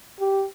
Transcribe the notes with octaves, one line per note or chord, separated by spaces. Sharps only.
G4